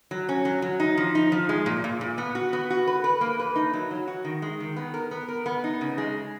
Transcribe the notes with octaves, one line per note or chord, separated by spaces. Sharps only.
F#3
C#4
F#3
F#3
D#4
F3
D#4
F3
G#3
A#2
A#2
A#2
B3
F#4
B3
F#4
B4
B4
A#3
B4
D#4
F#3
F#3
F#4
D#3
G#3
D#3
B3
A#4
B3
A#4
B3
D#4
C#3
G#3